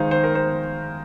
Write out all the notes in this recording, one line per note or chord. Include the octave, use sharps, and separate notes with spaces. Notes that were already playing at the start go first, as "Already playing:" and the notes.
Already playing: D#3 G#3 D#4 C5 F5
C5
A#4
C5